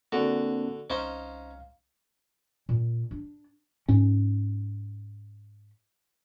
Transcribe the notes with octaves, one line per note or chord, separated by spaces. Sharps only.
D3 A#3 C4 D4 F#4
C2 C#4 D#4 C5 F5
A#2
D4
G#2 C#4